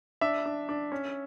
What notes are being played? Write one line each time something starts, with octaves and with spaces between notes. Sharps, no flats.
D4 E5
D4
D4
C#4